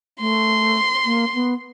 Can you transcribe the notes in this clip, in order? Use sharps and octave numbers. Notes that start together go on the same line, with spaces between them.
A3 C6
A#3
B3